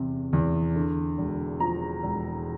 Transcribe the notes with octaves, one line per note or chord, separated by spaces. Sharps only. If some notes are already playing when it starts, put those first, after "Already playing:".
Already playing: E2 C3
E2
D3
E1
F3 A#5
E1